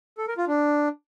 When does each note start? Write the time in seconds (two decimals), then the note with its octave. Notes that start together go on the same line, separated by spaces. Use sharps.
0.18 A4
0.28 A#4
0.38 F4
0.47 D4